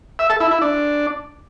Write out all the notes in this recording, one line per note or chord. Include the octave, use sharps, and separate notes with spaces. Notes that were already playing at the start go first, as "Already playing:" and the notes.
E5
A4
E4
E4
D4